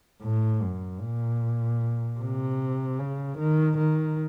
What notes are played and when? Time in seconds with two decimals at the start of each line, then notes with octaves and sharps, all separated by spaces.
0.22 A2
0.62 F#2
1.01 A#2
2.19 C3
2.99 C#3
3.38 D#3
3.77 D#3